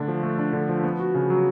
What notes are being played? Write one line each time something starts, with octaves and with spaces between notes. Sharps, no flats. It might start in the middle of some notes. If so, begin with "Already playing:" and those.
Already playing: D3 A3 D4
F3
A3
D4
D3
F3
B3
F#4
C#3
F#3